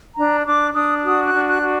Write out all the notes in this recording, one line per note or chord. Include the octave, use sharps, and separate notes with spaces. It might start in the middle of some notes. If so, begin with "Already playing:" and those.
D4 A#5
D4 D6
D4 D#6
F#4 D#6
F#6
D4
F#6
F#4